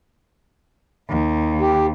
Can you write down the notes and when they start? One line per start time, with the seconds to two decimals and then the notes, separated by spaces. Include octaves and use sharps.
1.09 D#2
1.60 G4